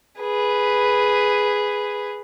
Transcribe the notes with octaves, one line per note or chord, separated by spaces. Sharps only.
G#4 B4